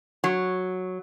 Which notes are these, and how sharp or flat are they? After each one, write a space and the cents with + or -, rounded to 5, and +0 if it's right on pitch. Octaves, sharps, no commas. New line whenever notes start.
F#3 -5